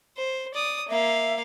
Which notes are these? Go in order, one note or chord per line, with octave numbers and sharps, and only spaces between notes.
C5
D5 D#6
A#3 E5 F5